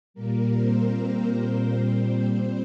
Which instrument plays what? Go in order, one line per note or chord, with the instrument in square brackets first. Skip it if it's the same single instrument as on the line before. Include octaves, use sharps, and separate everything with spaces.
[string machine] A#2 G3 A#3 A#4
C4 C5
A#2 G3